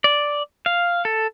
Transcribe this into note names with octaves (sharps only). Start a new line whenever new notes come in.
D5
F5
A4